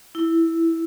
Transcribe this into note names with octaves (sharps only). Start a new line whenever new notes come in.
E4